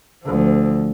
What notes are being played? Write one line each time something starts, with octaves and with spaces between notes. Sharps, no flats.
D2 F3